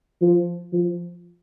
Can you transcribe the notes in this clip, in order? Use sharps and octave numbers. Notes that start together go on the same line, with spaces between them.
F3
F3